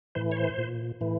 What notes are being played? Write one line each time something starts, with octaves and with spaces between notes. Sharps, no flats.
A2 E3 C5
C#5
C5
A#2
A2 E3